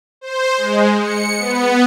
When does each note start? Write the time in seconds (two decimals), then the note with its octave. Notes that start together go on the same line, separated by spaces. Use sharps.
0.21 C5
0.57 G#3
1.01 C#7
1.39 B3